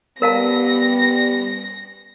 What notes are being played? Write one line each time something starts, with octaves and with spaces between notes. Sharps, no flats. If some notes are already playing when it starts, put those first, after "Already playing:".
G3 B3 A#4 F5 A5 A#6